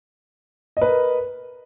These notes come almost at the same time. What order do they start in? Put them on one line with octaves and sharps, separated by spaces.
D#5 B4 A#4